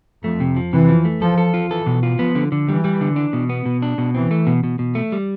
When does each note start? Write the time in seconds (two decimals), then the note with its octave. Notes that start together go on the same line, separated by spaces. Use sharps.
0.24 F2 A3
0.40 C3
0.56 F3
0.73 C3 E3
0.88 F3
1.05 A3
1.21 F3 A4
1.38 A4
1.54 F4
1.70 E3 A4
1.86 B2
2.03 F4
2.19 F3 B3
2.35 D3
2.52 D3
2.68 E3 G3
2.84 G3
3.01 D3
3.16 D4
3.33 B2
3.49 B3
3.66 B2
3.82 D4
3.98 B2
4.14 E3 C4
4.31 A3
4.47 B2
4.64 B2
4.79 B2
4.95 A3
5.12 G3